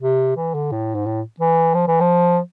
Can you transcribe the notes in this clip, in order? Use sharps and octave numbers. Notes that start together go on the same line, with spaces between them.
C3
E3
D3
A2
G#2
A2
E3
F3
E3
F3